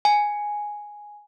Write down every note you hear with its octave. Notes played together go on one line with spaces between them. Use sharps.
G#5